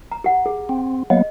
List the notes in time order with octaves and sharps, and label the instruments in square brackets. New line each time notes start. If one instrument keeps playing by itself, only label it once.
[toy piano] A#5
G4 F#5
G#4
[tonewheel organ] C4
[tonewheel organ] F#3 A#3 B3 [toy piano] D#5